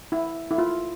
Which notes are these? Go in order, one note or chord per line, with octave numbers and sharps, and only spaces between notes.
E4
E4
F4